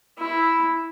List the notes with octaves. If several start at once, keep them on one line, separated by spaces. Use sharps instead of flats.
E4